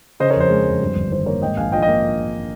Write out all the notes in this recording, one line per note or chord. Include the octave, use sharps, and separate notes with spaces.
C#3 C5 D#5
A#4 C#5
F2 C5
G#3
F2
G2
G1
D#3 C5
A#3 A#4 C#5
G#2 D#5 G5
A#1 F5 G#5
F3 D#5 G5
D#5 G5
A#3